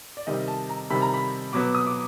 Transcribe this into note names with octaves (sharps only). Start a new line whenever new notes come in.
D5
C3 D#3 G3 C4 D#5
A5
A#5
C3 D#3 G3 C4 B5
A#5
B5
B2 F#3 B3 D6
D#6
D6